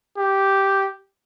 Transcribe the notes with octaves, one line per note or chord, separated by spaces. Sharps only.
G4